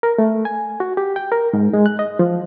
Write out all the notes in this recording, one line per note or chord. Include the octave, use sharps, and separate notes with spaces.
A#4
A3
G#5
F#4
G4
G5
A#4
G#2
G#3
F#6
D#5
F3